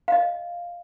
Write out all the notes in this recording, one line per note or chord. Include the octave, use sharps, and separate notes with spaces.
D#5 F5